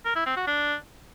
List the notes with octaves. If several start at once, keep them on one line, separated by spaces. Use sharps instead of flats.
A#4
E4
C4
F#4
D4